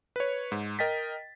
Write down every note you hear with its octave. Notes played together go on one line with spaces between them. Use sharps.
B4 C#5
G#2
A#4 D#5 G5 A6 B6